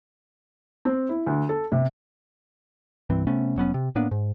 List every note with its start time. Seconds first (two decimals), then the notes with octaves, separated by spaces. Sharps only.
0.85 C4
1.09 E4
1.26 D2
1.49 A4
1.72 C3
3.10 C2 G2 E3 C4
3.27 C3 A3 B3 C#4
3.56 F1 F#3 B3 C#4
3.74 C3
3.95 A2 A#3 B3 D4
4.11 G#2